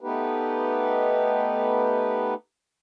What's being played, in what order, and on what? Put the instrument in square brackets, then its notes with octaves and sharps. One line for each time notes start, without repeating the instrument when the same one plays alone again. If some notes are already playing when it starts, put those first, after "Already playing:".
[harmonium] A3 B3 D#4 G4 B4